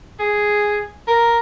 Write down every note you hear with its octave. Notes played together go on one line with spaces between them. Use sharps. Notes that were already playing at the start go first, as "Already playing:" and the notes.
G#4
A#4